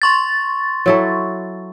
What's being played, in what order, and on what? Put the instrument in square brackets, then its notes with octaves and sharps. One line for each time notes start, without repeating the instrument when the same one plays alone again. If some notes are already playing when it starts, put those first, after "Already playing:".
[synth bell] C6 C#6 A6
[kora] F#3 E4 A4